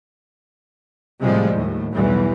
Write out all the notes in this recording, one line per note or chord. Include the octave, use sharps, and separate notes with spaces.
A2 C3 F3 G3 G#3
D#2 A2
B1 E2 E3 G3